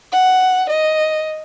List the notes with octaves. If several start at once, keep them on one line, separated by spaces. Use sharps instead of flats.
F#5
D#5